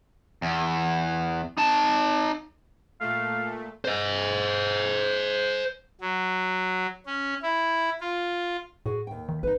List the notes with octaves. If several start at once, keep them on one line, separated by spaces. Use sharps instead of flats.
E2
D#4 A5
A#2 A3 F5
C5 D#5
F#3
C#4
E4
F4
A2 F#4 G#4
D#2 G5
D#3
A1 D#4 B4